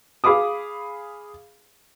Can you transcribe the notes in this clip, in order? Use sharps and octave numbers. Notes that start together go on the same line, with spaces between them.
G#4 F5 B5 D6 D#6